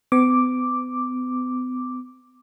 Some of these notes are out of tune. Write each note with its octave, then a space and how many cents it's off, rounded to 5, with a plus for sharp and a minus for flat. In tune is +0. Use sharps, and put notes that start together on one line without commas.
B3 +45 D6 +0